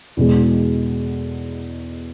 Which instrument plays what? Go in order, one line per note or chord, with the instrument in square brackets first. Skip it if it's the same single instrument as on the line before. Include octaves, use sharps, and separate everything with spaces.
[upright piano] E2 B2 G#3